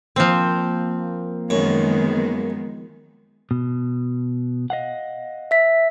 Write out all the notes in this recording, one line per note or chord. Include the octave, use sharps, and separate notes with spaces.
F3 A#3 C4
F#2 D#3 G#3 B3
B2
D#5 F5 F#5
E5 B6